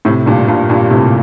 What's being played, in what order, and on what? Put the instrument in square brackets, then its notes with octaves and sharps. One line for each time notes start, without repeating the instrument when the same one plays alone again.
[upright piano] A2 C3
G2 A#2
G2 A#2
G2 A#2
A2 C3